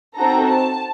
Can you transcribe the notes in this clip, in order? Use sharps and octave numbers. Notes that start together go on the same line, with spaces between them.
C4 D#4 F#4 A4 A#5
A5